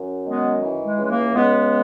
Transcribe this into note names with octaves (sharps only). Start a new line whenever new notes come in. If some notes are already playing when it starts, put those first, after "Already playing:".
Already playing: F#2
D#3 G#3 B3
E3
G#3
C#2
G#3
A#3
C#2 G#3 B3